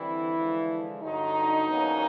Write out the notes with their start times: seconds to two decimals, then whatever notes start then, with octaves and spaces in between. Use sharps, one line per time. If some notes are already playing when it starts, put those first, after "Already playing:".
Already playing: D3 E3 G3 C4 E4
0.35 D3 F3 G#3
1.02 G2 D3 F#3 D#4
1.67 E2 B2 F#3 A#3 C#4